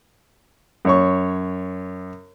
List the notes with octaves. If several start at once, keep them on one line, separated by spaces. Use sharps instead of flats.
F#2 C#5 C#6